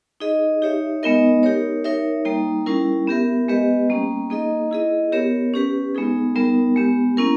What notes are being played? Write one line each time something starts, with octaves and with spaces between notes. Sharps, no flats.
D#4 G#4 D#5
D#4 G4 C#5 E5
G#3 B3 D#4 A#4 D#5
D#4 G4 A#4 C#5
D#4 A#4 C#5 E5
G3 A#3 D#4
G3 C#4 E4 A#4
B3 G4 A#4 E5
G#3 B3 G4 B4 D#5
G3 A#3 C#4
A#3 D#4 G#4 D#5
E4 G#4 D#5
B3 G4 A#4 C#5
C#4 G4 B4
G#3 B3 D#4 G#4
G3 B3 D#4 A#4
G#3 B3 G4
A#3 C#4 E4 A#4